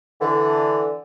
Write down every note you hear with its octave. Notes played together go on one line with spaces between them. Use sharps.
D3 E3